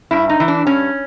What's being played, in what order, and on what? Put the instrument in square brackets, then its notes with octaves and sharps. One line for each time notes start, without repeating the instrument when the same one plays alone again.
[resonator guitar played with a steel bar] G2 E4
D#4
E3
D4
G2 C#4